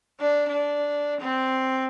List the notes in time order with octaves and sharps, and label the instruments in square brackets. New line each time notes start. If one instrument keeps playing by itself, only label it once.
[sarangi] D4
D4
C4